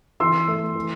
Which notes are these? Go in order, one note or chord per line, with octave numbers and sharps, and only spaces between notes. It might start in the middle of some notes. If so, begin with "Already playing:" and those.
E3 C6 E6
A3
E3